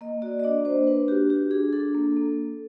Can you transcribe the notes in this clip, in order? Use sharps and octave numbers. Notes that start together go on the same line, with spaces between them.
A#3 D#5
F#4 D5
D#5
D4 D5
A#3 C5
D4 B4
F#4 G4
F#4 G4
D4 G#4
D4 A4
A#3
A#3